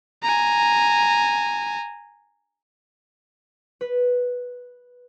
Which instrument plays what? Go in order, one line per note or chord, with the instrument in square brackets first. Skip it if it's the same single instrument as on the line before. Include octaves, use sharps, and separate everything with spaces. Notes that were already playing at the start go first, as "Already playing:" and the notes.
[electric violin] G#5 A#5
[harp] B4